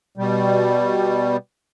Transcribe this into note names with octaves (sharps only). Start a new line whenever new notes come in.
B2 G3